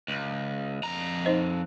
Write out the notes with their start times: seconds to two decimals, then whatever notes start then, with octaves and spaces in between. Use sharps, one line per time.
0.08 C#2
0.83 F2 A#5
1.25 D#4 C5 D#5